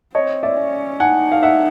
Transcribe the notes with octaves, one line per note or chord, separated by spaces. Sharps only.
C4 C#5 D#5
D5 E5
C#4
D#4 F#5 G#5
F5
E5 F#5